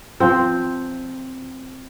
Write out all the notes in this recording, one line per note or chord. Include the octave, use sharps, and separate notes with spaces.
F3 C4